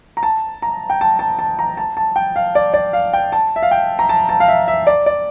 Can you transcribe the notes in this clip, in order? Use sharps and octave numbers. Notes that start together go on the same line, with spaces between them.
A#5
A5
A#5
G5
A5
A5
A5
A#5
A5
A5
G5
F5
D5
D5
F5
G5
A5
E5
F5
G5
A#5
A5
A5
F5
E5
E5
D5
D5